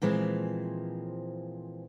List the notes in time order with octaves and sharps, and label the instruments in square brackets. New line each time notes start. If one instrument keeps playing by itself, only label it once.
[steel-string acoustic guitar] A#2 E3 F3 G#3 C4